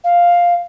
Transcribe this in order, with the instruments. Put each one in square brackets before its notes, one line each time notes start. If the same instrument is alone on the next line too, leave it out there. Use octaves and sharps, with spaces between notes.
[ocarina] F5